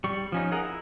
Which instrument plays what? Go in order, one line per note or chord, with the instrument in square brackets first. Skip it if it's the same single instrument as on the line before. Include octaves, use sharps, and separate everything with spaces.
[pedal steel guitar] G3 C#6
F3 C#4 D#4
G#4 A#4 D#5 F#5 A#5
E4